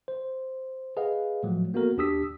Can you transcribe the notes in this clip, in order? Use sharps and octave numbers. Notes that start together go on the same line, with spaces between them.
C5
G#4 B4 D#5 F5 F#5
A2 F3 F#3 A3
A#3 B3 F#4 A4 A#4
D#2 D4 G4 D#6 E6 B6